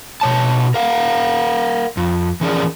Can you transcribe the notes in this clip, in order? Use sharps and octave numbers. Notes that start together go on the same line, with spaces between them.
B2 C#5 A5
A#4 F5 F#5
F2
E3 F3 C#4 G#4 A#4 D5